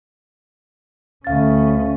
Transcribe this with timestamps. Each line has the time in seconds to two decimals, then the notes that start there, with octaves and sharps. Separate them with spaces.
1.24 D2 C#4 F5 A6